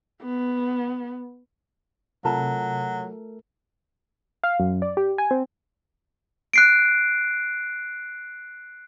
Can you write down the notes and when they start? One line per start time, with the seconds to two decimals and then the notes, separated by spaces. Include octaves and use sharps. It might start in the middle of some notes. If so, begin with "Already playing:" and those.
0.23 B3
2.25 C3 F#3 A3 F4 A4 A#4 A5 A#5
4.43 F5
4.60 F#2
4.82 D5
4.97 G4
5.18 G#5
5.31 C4
6.54 F#6 C7 D7